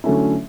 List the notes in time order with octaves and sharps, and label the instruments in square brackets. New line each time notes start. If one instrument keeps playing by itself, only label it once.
[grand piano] D3 F#3 A3 C#4 E4